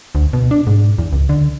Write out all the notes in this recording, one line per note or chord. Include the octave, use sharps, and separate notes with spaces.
D2
B2
D4
G#2
E2
C#2
D3